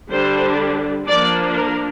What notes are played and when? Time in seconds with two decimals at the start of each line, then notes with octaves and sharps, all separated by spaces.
0.11 D3 G3 D4 C5
1.07 F3 A#3 D4 D5
1.56 A#4